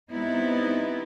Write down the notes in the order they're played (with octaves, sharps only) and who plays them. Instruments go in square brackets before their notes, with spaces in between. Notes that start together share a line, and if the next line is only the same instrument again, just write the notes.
[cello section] G3 B3 C4 D#4 E4